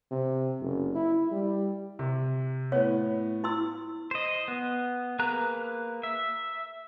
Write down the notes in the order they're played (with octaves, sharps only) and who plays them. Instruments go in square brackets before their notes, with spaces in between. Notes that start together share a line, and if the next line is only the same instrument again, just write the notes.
[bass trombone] C3
F#1
E4
G3
[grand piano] C3
[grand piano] A2 B3 [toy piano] C#5
[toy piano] E4 C6 E6
[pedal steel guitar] C5 D#5
B3
A#3 G#4 B4 A#5 F#6
E5